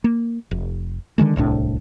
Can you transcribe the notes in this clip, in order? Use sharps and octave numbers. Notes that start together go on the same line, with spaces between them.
A#3
F1
D3 D#3 G#3 A3
D1 C2 A2 D4